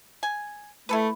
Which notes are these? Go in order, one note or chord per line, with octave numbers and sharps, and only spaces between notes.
G#5
A3 E4 A4 B4